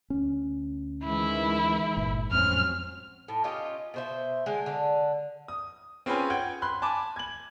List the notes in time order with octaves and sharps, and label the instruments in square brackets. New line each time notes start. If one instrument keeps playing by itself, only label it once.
[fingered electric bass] D2 C#4
[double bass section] D#3 E3 G#3 [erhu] E4
[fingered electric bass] G1 A#2
[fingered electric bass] F2 A2 [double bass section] F#3 C4 C#4 [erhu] F6
[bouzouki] A2
C#4 F4 G4 D#5
B2 C5 E5
D3 G#3
D3
[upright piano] D#6
C4 C#4 F4 G#4 B4 G#5
F#5 G5 G#6
B5 C6 F#6
G#5 A5 B5 D6
G#6 F#7